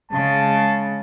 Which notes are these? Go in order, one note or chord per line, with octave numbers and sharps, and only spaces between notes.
C#3 G#3 A5